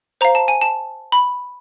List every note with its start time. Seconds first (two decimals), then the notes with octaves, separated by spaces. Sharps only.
0.21 C5 F5 A#5
0.35 A5
0.48 G#5
0.62 A5
1.12 B5